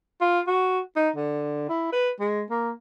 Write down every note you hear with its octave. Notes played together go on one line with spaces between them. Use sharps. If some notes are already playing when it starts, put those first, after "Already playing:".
F4
F#4
D#4
D3
E4
B4
G#3
A#3